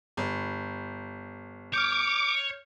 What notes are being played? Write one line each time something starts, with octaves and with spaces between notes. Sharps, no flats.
G1
C#5 D6 F6 G6